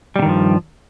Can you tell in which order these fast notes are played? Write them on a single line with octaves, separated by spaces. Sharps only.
G3 C3 D#3 G2 F3